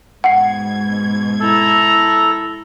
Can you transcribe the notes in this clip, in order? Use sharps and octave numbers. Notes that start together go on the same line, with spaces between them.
G#2 B2 F#5 G#6 C7
E4 A4 A#5